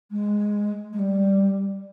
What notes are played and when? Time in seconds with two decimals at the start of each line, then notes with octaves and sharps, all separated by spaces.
0.11 G#3
0.93 G#3
0.99 G3